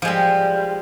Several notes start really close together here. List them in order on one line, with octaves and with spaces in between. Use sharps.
F3 G#3 G3